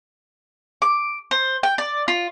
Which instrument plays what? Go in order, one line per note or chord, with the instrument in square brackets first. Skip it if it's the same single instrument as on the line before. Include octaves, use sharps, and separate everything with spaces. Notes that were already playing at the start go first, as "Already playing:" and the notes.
[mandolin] D6
C5
G5
D5
F4